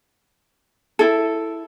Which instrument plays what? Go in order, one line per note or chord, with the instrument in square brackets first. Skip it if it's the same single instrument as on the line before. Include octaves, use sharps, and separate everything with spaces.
[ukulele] E4 A4